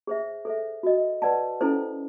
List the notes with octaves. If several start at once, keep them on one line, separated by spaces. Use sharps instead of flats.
G#4 C5 E5
A4 C5 E5
F#4 A#4 D#5
B4 D5 F#5 A5
C#4 E4 A4 C5